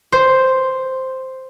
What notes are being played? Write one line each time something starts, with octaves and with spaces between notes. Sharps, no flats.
C5